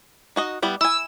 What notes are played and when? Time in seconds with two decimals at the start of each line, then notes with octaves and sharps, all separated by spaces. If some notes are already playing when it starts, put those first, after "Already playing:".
0.36 D#4 F#4 D#5
0.62 G3 B3 E4
0.81 E4 G#5 E6